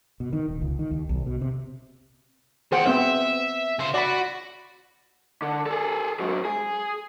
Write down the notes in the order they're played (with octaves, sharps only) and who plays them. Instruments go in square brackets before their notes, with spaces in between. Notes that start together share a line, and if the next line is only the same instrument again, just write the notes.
[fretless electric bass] B2
D#3
D#1
C#2
D#3
D#2
B1
B2
C3
[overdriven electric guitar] E2 F#5 [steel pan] G#4 C5 G5
[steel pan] B3 C4 C5 [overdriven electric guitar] E5
[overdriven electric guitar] C#3 C5
[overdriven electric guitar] F#4 [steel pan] D5 B5
[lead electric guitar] D3
G#4 A4
G#2 F#3
G#4